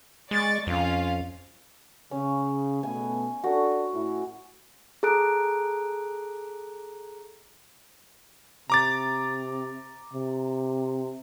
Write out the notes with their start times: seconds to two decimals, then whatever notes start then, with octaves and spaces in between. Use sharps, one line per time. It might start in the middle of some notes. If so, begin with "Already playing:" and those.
0.31 G#3 D5 C#6 A6
0.67 F2 C#4 F4 F5
2.11 C#3 C#4
2.83 B2 A3 B3 G#5
3.44 D4 F#4 A4 D5
3.93 A2 A3 E4
5.03 G#4 A4 A#5 F#6 D7
8.70 C3 A#5 D6 A6
10.13 C3